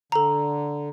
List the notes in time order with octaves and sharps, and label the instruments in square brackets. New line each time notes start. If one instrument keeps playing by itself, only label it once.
[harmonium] D3 [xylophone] A4 A#5